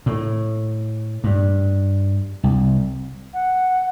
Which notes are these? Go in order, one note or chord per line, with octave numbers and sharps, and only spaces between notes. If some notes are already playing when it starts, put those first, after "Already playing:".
A2
G2
C2
F#5